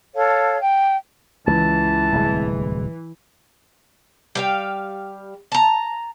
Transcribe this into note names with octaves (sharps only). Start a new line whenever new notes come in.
A4 C#5 F5 A5
G5
C#2 E3 A5
D1 C2 G#3
G3 F5 G5
A5 A#5